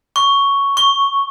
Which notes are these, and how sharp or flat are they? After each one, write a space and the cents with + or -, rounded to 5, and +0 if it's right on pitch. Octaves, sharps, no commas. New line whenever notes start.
C#6 +5
C#6 -5